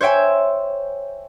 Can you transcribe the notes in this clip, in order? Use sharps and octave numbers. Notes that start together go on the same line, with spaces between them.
C5 C#5 E5 G5 G#5